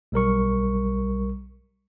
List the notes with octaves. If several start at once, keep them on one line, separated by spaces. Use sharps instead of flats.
B1 G3 A#4 C#6